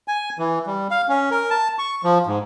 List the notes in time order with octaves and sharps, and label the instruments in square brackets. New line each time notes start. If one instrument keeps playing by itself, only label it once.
[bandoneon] G#5
E3
G3
F5
C#4
A#4
A5
C#6
F3
G#2